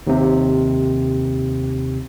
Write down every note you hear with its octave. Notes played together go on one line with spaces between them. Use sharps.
D#2 C3